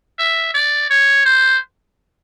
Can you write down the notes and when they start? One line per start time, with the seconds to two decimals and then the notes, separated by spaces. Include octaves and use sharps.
0.18 E5
0.54 D5
0.90 C#5
1.25 C5